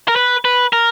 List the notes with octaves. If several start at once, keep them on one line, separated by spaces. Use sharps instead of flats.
A#4
B4
B4
A#4